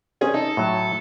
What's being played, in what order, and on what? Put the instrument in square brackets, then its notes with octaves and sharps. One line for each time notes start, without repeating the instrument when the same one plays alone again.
[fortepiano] C4 C#4 G#4
[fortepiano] D#4 [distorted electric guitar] A4
[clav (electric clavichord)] A2 F#3